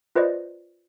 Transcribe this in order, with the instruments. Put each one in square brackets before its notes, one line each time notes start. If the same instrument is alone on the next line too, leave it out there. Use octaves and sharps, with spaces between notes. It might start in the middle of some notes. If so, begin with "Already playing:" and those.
[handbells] F4 B4 C5 D5 D#5